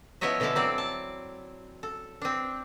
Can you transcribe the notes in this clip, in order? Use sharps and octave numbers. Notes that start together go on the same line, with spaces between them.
F3 B3 E4 C#5 D#5 E5
B2 D3 F3 E4 A4 A5
F#3 C4 D5
A5
A4
C4 D4